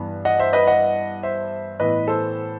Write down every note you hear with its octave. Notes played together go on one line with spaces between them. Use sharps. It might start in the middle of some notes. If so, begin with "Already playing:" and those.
Already playing: G2 E3 B3
D#5 F#5
C5 E5
B4 D#5
D#5 F#5
C5 E5
A2 E3 B3 B4 D#5
A4 C5